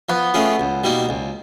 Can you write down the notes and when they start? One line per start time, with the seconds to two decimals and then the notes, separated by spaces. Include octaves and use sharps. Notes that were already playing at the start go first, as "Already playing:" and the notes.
0.09 F3 B3
0.34 A3 C#4 F4 G#4
0.60 C#2
0.84 B2 G3 A#3 D#4
1.09 C#2